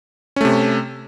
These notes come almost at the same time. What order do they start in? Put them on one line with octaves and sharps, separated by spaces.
C#4 A3 C3